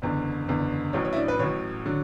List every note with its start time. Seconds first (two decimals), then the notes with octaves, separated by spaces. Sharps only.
0.02 F#1 E2 D3
0.48 F#1 E2 D3
0.93 A1 A2 F#3 C#5
1.05 C#5
1.13 E4
1.16 D4
1.28 B4
1.39 A1 A2 F#3 C#5
1.86 D3 F#3